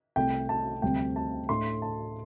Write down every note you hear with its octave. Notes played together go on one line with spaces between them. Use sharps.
C2 C3 A3 G5
A5
D2 C3 G3 C4 G5
A5
A2 A3 D4 C6
A5